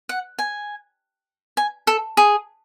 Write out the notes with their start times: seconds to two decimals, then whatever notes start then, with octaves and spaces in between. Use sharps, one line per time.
0.09 F#5
0.39 G#5
1.57 G#5
1.87 A4
2.17 G#4